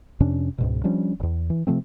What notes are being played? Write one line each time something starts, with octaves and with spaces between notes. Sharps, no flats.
F2 C3 C#4 D4
C#2 G#2 B2
F3 G3 C#4 D4
D#1 E2
E3
C3 F3 A3 C4